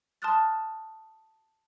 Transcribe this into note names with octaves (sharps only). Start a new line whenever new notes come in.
A5 C6 D#6 F6 F#6 A6